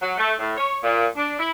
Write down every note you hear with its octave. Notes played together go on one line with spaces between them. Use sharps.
F#3
A3
A2
C#5
A#2
D4
E4